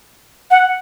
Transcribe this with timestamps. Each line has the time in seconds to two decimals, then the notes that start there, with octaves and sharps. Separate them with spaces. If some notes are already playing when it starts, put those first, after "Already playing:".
0.51 F#5